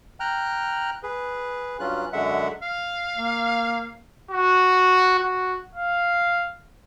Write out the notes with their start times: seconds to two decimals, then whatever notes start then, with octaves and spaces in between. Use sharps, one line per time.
0.20 G5 A#5 F6 F#6
1.03 G#4 B4
1.80 G2 F#3 C#4 F4 F#6
2.13 F#2 D3 G#3 E5 F#5
2.62 F5
3.17 A#3
4.31 F#4
5.19 F#4
5.75 F5